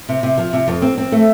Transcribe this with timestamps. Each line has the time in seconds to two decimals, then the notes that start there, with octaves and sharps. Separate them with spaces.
0.09 C3
0.23 C3
0.38 F3
0.53 C3
0.68 F2
0.82 C4
0.98 C4
1.12 A3